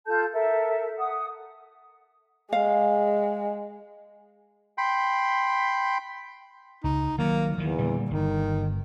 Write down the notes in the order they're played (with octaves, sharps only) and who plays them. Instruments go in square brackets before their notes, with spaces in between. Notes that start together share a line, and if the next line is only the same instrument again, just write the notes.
[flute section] F4 A4 A5 G6
A4 A#4 E5
F#5 D#6
[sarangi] G#3 [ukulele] F5
[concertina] G5 B5 C6
[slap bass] C#2 [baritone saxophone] D#4
[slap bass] D#3 F#3 [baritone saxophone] A#3
[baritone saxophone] E2 [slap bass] D#3 E3
[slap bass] A#2 D3 G3
[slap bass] G1 [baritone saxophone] D#3